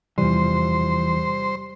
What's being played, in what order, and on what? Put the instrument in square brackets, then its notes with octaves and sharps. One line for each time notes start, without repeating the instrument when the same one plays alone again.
[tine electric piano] E2 C3 [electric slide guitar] E3 F3 [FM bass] G3 [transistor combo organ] C5